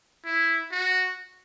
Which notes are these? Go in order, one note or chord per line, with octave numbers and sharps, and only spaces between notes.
E4
F#4